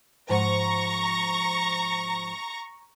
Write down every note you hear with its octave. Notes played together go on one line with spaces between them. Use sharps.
G#2 F3 F#5 A#5 C#6 A#6